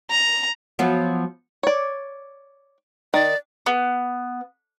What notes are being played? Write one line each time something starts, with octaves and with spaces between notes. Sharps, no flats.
A#5
F3 F#3 B3
C#5 D5
D#3 D5
B3